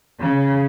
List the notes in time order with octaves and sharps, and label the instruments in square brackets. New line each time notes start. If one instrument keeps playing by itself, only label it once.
[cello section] C#3